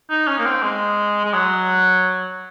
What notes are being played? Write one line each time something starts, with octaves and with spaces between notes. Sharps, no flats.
D#4
C#4
A#3
C4
G#3
G#3
F#3